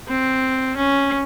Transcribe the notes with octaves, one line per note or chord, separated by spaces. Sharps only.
C4
C#4